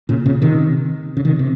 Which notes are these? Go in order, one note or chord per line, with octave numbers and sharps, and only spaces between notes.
A#2 C#3
A#2 C#3
C3 D#3
C#3
C3 D#3
C3